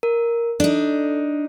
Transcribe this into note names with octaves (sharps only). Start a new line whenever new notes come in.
A#4
D4 D#4 A4